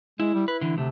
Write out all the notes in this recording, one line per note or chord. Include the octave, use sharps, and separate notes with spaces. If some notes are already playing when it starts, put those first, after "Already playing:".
G#3 E4
G3
E4 B4
D3 E3
D2 C3 A3